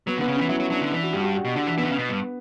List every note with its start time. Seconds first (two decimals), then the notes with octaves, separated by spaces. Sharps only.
0.07 F#3 B3
0.18 D3 B3
0.28 C#3
0.36 E3 C#4
0.49 F#3 E4
0.60 F#3
0.70 F#3 D4
0.81 D3
0.92 E3 D4
1.03 F#4
1.13 G2 G4
1.20 F#4
1.24 G4
1.35 F#4
1.45 B2
1.56 D3 D4
1.67 E3
1.77 E3 B3
1.83 D3
1.88 C#3
1.98 B2
2.09 G2